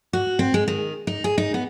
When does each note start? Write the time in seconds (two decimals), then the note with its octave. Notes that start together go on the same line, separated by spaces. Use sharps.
0.13 F#4
0.39 C4
0.54 G#3
0.68 D#3
1.07 D#4
1.24 G#4
1.38 D#4
1.54 B3